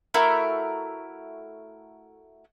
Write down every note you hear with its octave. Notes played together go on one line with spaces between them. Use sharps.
A3 E4 F#4 A#4